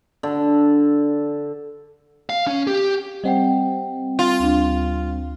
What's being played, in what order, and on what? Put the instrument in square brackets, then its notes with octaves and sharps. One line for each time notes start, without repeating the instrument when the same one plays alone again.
[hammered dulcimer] D3
[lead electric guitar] F5
C#4
G4
[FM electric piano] G3 C4 [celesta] D#5 F#5 G5
[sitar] F4
[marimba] D2 D4